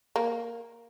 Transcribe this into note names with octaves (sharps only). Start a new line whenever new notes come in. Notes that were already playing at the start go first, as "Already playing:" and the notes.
A#3